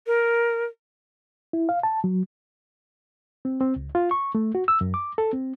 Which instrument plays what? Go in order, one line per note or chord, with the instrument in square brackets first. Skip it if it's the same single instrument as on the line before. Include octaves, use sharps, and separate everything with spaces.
[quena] A#4
[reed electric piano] E4
F5
A5
F#3
C4
C4
C#2
F4
C#6
A3
F#4
E6
F#2
D6
A4
C4